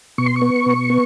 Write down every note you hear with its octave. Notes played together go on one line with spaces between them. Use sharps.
B2 C#6
C6
C#6
B3
B2
B3